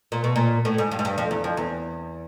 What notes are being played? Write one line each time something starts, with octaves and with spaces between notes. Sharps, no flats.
A#2
B2
A#2
A2
G#2
G2
G#2
G2
F2
E2
F2
E2